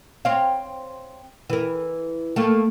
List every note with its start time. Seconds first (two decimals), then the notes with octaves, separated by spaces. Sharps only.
0.25 C4 C#5 F5
1.50 E3 A#4
2.36 A3 A#3